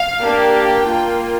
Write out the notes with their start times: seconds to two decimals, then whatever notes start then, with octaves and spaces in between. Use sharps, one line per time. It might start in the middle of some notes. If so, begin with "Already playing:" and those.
Already playing: F5
0.23 A#3 D4 G4
0.56 G5
0.89 A#3 F4